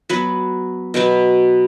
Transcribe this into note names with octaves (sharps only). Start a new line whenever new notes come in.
F#3 B3 F#4 B4
B2 F#3 B3 F#4